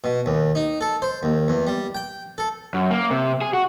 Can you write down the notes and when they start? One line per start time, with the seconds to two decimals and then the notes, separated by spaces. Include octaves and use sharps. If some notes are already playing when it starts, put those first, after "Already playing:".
0.04 B2
0.26 D#2
0.55 D#4
0.81 A4
1.02 C5
1.23 D#2
1.48 E2
1.67 G3
1.95 G5
2.38 A4
2.74 F#2
2.91 A#3
3.11 C3
3.41 G#4
3.54 F#4